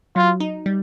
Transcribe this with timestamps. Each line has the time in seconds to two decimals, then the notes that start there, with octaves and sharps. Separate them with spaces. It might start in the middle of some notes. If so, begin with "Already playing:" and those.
0.16 F#3 F4
0.40 D#4
0.66 G3